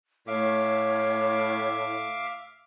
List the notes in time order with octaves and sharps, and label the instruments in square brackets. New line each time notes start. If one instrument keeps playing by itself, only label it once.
[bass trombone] A2 [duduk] A3 [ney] C#5 [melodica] E5 F5 D6